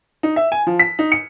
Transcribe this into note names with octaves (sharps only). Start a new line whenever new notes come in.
D#4
E5
G#5
F3
B6
D#4
C#7